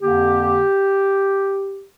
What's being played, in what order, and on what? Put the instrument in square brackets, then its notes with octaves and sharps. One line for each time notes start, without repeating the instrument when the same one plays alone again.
[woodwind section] F2 D3 A#3 G4